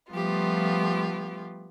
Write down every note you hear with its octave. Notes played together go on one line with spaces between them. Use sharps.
F3 G3 A3 B3 F4 G4